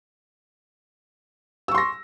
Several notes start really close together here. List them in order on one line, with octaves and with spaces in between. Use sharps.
E6 C#6 C6 A#6